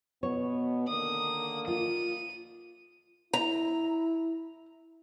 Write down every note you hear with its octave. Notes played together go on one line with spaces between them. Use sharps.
B2 B3 C#5
D3 D#3 A#3 D#6
F4 D#7
E4 A#5